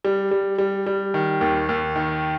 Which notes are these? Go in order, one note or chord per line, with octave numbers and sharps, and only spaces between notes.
G3
G3
G3
G3
D#3
D#2
D#2
D#3